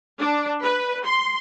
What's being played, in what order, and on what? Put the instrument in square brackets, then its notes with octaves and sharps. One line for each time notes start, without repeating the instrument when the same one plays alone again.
[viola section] D4
B4
C6